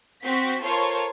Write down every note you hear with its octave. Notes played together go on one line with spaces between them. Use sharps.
C4 F#4 B6
F4 A4 A#4 C5 C#5 C#6